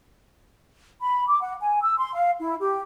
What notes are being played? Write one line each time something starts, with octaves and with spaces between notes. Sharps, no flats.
B5
D6
F#5
G#5
E6
C6
F5
E4
G4